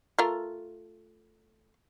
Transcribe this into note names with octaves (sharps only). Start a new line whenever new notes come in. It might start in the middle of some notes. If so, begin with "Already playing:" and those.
A3 F4 A#4